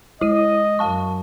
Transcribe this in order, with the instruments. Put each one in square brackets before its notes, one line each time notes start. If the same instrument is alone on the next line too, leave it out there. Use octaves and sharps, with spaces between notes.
[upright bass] G#3 [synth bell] E4 D#7 [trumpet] D#5
[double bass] F#2 [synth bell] F5 A5 C#6